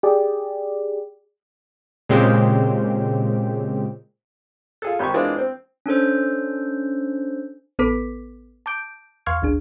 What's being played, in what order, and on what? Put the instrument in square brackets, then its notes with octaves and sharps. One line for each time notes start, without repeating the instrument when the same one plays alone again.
[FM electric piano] G4 G#4 D5
[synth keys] A#2 C#3 G#3 C4 G4
[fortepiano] F4 G#4 A4
G#1 G4 A#4 C6 C#6
E3 G#3 A#3 C4 D4 F4
C4
[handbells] C#4 D4 A4 C5
[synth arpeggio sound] A1 B3 A4 B4 D6 B6
A5 D6 G6 D7
E2 F5 C6 C#6 F6 G#6
G#1 D2 D4 G#4